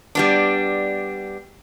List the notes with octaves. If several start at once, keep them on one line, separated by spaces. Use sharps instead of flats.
G3 B3 D4